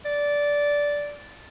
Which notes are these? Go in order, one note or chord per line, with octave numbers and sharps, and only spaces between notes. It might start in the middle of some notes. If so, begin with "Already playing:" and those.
D5